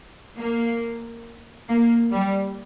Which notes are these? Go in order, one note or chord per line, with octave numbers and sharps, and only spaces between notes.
A#3
A#3
G3